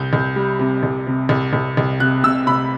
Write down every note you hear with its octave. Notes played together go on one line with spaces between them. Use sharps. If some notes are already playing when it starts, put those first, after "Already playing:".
Already playing: C2 G6
C2
G3
C3
C2
C3
C2
C2
C2
C3 F#6
C3 E6
C3 B5